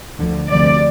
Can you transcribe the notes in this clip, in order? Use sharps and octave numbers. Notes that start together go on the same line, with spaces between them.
D2 D3 F3
D2 C3 F3 D5